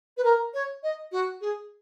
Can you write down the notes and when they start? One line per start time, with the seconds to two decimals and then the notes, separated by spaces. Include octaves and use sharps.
0.17 B4
0.24 A#4
0.54 C#5
0.83 D#5
1.12 F#4
1.41 G#4